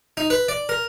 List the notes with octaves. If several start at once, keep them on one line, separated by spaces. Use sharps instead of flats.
D#4
B4
D5
A#4